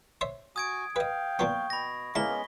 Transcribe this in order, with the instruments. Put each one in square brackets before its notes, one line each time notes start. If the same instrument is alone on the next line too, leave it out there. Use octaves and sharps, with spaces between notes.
[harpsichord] C5 C#5 E5
[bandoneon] F#4 G#5 [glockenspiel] D#6 G#6 D7
[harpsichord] B4 D#5 [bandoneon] F5 [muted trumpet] G5
[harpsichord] A#2 F3 B3 [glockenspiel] C#6
[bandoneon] B2 [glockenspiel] B5 A#6
[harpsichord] C#2 E4 [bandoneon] G#3 B3 C#4 [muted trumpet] A#3 [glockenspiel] B6 G7